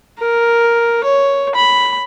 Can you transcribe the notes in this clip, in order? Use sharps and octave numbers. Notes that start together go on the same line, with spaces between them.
A#4
C#5
B5